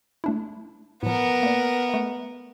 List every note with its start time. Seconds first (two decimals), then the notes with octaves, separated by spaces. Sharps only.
0.24 A3 D4 E4
1.03 A2 F3 B3 A#4
1.43 A#3 D5
1.89 A3 F5